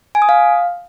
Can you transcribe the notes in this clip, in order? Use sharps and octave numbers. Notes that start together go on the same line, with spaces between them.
G#5
D#6
F5